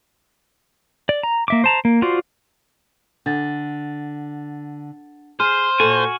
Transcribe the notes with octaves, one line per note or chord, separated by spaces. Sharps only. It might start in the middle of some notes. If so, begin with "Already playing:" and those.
D5
A#5
A#3 E5 D6
C5 A5 A#5
A#3
F4 F#4 C5 D5
D3 D4 F#5 A6
G#4 C5 F6 D#7
A#2 F#4 A4 G#5